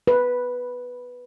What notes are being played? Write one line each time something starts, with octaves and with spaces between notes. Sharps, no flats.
B4